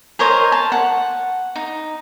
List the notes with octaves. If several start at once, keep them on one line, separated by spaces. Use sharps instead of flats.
A#4 C5 C#5 D#5
A5
F#5
D#4